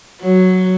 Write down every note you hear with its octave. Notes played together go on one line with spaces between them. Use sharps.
F#3